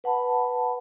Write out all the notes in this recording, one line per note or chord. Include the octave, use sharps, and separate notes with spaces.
B4 F#5 A5 B5